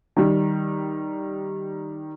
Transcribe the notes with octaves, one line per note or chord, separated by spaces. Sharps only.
D#3 G3